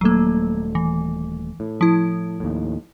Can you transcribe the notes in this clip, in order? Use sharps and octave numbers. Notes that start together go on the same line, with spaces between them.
D#1 F#3 A3 A#3
E3
A2
F3 E4
D#2 A2